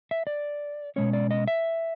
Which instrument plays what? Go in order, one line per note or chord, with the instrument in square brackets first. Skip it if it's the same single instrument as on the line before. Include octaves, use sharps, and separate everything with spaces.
[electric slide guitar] E5
D5
B2 G#3 C#4 C#5
D5
D#5
E5